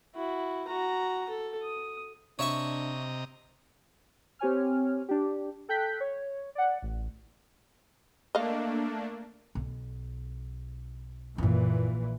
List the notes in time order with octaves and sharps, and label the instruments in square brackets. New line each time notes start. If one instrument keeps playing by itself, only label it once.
[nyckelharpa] E4 F#4
F#4 A#5
A4
D#6
[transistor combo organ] C3 D#5 A#5 [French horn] D4 [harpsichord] C#5 E5 C#6
[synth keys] C4 G4 C#5 G#5 F6
D4 G4
A4 G5 F#6 G6 B6
C#5
D5 F#5
A1
[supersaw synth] A3 A#3 D4 [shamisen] D#5 F5
[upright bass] B1
[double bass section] A#1 A#2 E3 [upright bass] F#2 E4